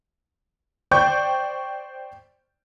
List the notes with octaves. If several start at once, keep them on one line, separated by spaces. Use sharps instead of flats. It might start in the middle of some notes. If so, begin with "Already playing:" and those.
C5 D5 G5 C#6 G6